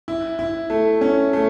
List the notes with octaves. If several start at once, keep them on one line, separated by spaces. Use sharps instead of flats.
E4
E4
A3
C#4
A3